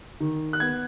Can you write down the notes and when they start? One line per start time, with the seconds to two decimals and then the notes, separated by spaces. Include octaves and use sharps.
0.20 D#3
0.53 F#6
0.60 B3 G#6